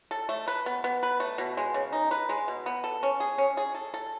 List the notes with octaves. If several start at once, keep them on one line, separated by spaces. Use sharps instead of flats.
A4
A3
B4
B3
B3
B4
A3
B2
G#3
C#3
D#4
B4
G#3
B2
B3
A4
C#4
G#4
C#4
G#4
A4
A4